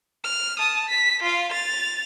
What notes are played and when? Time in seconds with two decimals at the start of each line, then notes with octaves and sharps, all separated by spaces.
0.24 F6
0.59 A5 D#6
0.89 B6
1.23 F4 F5
1.52 A6 F7